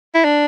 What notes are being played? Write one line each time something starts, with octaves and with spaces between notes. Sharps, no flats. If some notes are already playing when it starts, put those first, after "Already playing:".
E4
D4